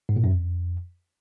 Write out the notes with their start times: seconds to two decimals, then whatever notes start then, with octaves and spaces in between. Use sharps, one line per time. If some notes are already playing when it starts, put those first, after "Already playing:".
0.09 G#2
0.16 A#2
0.24 F#2
0.31 F2